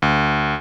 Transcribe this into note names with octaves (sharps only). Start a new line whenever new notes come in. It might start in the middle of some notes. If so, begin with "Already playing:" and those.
D2